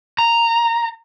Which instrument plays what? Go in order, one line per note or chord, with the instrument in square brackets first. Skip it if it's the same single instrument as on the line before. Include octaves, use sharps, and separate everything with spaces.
[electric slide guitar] A#5